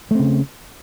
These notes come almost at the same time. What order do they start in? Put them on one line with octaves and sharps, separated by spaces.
A3 C4 C#3